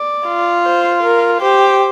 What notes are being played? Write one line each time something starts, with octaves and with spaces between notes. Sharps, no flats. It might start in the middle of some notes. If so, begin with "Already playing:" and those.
Already playing: D5
F4
C5
A#4
G4 C5